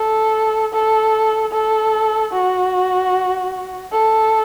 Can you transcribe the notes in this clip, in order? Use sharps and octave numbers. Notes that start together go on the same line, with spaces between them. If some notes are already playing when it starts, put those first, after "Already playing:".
Already playing: A4
A4
A4
F#4
A4